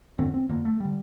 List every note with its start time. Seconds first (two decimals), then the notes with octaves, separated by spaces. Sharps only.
0.18 F2 D3 C4
0.34 C4
0.49 F2 D3 A#3
0.65 A3
0.80 D3 G3